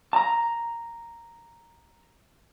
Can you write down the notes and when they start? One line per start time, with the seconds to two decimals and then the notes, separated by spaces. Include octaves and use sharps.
0.13 A5 A#5